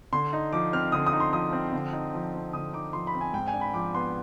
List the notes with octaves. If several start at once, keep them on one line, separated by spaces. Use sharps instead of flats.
D3 C6
D#4
F3 D6
C4 F6
D3 D#6
D#6
D#4
C6
F3 D#6
C4
D3
D#4
F3
C4
D3 D#6
D#4 D6
F3 C6
B5
C4
G#5
G#2 G5
G#5
D4
B5
F3 D6
B3 C6